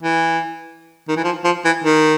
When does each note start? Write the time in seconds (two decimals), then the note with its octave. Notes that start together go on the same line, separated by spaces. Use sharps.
0.03 E3
1.08 D#3
1.17 E3
1.24 F3
1.44 F3
1.65 E3
1.84 D#3